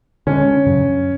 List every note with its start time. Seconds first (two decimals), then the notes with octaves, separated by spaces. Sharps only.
0.27 D3 G#3 C#4 D4
0.66 F#2 C#3 F#3